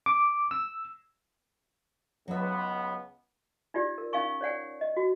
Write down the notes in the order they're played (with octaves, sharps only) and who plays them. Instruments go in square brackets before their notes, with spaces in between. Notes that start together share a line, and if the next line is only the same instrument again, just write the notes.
[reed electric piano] D6
E6
[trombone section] C#2 B3 [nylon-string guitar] F#3 E5
[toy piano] D#4 F4 G4 D5
A#4
C#4 D#4 F5 G#5 C#6
C#5 D5 F#5 G#5
D#5
F#4